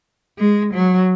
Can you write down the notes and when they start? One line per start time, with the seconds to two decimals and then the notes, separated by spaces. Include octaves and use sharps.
0.38 G#3
0.74 F#3